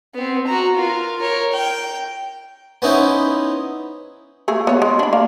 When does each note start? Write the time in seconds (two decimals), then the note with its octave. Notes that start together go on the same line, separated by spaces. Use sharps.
0.14 B3 C4
0.47 F#4 A#5
0.76 F4 A#4
1.20 A#4 C#5
1.52 G5
2.82 B3 C#4 D#4 E4 C5
4.48 A3 A#3 G#4
4.67 B3 C#5
4.82 G#3
4.99 D4 B5
5.13 A#3 F5